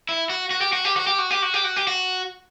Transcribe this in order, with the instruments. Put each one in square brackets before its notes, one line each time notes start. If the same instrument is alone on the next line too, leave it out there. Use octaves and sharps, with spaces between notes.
[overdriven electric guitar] E4
F#4
F#4
G4
F#4
G4
F#4
G4
F#4
G4
F#4
G4
F#4
G4
F#4